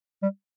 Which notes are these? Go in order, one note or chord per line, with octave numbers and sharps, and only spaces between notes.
G3